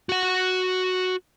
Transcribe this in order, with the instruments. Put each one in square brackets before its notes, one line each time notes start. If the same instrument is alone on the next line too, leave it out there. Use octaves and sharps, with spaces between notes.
[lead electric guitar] F#4 F#5